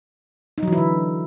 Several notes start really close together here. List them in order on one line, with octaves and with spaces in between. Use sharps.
D#4 F#3 E3 E4 D3